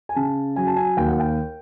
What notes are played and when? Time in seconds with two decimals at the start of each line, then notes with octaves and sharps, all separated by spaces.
0.09 G#5
0.15 C#3 A5
0.56 F#3 G#5
0.67 A5
0.77 G#5
0.97 D#2 G5
1.08 F#5
1.20 G5